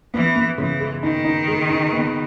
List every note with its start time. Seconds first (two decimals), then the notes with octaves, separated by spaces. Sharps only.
0.14 E3 B3
0.36 B3
0.58 C#3 E3
0.80 G#3
1.03 D#3 D#4
1.25 D#4
1.48 G#3
1.69 D#4
1.92 B3